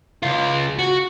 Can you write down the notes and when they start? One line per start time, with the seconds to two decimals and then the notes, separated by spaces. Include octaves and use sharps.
0.23 C#2 F4
0.79 F#4